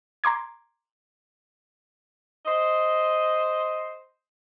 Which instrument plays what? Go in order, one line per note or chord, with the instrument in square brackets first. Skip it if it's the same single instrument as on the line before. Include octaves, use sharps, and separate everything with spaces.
[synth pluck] A#5 C6 D6 G#6
[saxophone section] C5 D#5